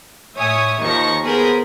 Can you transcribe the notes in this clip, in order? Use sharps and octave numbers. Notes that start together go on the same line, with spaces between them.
A2 C#5 E5 G#5 D#6
D#2 D#3 F3 C#6 A#6
B3 G#4 A#4 C5 A#5 B5